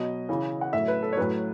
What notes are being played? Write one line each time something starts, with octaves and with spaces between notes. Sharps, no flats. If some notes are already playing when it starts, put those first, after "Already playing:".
Already playing: B2 F#3 D#5
C#3 E3
F#5
A2 F#3 E5
B4
A4
C#5
A2 F#3 B4